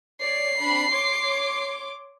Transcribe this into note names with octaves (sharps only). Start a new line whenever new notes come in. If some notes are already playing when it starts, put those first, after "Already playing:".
C#5 D5 C7
C4 D4 B5
C#5 C6 D6